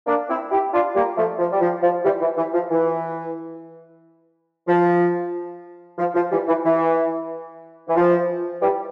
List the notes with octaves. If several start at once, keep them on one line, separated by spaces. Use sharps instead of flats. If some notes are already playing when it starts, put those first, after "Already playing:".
A#3 D4
C4 E4
E4 G4
D4 F4
G3 A#3
F3 A3
F3
G3
F3
F3
E3 G3
E3
E3
F3
E3
F3
F3
F3
E3 G3
E3
E3
E3
F3
E3 G3